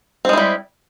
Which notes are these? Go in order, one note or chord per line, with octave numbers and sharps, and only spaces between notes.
G3 G#3 C4 E4